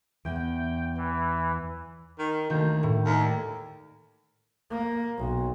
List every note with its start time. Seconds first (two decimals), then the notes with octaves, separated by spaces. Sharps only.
0.25 E2 G5
0.97 E3
2.19 D#3
2.50 D2 D#3 A#3 G6
2.83 A2
3.06 D#2
3.20 D5 G#6
4.71 A#3
5.19 B1